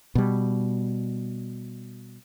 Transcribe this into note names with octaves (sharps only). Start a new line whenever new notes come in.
B2 G3